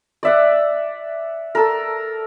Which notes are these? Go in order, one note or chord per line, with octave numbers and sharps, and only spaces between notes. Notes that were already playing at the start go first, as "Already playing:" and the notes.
D5 E5 F#5
A4 A#4